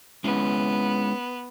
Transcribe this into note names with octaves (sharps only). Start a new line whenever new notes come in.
G#3 B3 C#4 E4